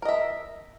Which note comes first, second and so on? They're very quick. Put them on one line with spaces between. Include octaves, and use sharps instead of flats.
A#4 D#5 E5